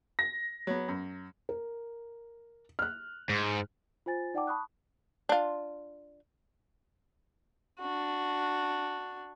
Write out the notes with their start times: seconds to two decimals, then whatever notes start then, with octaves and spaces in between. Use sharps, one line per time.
0.19 A#6
0.67 F#3 B3
0.88 F#2
1.49 A#4
2.79 F6 F#6
3.29 G#2
4.06 F4 C5 G#5 A6
4.34 D#4 D5 F#5 G5 A5 D6
4.47 A5 B5 C#6 D#6 F#6
5.29 D4 F4
7.80 D4 F#4